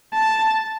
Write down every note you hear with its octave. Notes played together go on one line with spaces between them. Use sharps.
A5